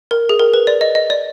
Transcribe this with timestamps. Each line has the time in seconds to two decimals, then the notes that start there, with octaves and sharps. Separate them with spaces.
0.11 A#4
0.29 G#4
0.39 A#4
0.54 B4
0.67 D5
0.81 D#5
0.95 D#5
1.10 D5